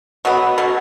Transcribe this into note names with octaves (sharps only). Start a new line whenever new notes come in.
B2 F#3 B3
B2 F#3